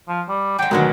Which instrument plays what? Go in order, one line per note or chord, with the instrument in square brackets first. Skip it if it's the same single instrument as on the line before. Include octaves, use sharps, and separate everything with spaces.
[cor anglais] F3
G3
[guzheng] F#3 G#3 [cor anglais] G5
[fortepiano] D2 F#3 A#4 [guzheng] B2 D#3 B3 [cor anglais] G#3